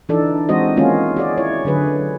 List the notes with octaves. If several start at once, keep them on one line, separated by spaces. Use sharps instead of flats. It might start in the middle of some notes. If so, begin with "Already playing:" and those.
E3 D4 D#4 A4 D5
E3 G#3 C4 F#4 C5 D#5
D#3 G#3 A#3 C#4 F4 F#4
F#4 G#4 D5
E4 C#5
D3 F#3 G#4 B4